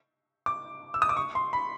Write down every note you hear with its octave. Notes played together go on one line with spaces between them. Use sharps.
D6
E6
D#6
D6
C#6
C6
B5